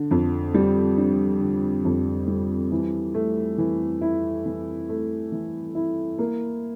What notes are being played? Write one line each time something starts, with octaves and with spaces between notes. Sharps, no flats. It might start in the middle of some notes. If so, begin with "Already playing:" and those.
Already playing: D3 D4
F2
G3
D4
D3
F2
G3
E3
A3
E3
E4
E3
A3
E3
E4
A#3